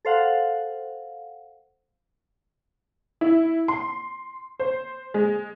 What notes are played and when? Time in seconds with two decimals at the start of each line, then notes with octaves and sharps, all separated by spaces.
0.05 A4 C5 F5 F#5
3.21 E4
3.68 C6
4.59 C5
5.14 G#3